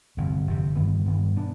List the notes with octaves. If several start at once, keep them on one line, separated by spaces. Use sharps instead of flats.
G1 F2 C3
G1 F2 C3
G2 D#3 B3
G2 D#3 B3
B2 B3 D4